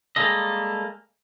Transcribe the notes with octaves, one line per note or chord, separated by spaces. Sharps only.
G3 G#3 A#3 F4 A4 D#5